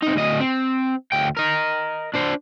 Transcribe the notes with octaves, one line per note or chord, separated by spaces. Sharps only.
C3 D#4
D2 D#5
C4
D2 G5
A#4 D#5
D4 C5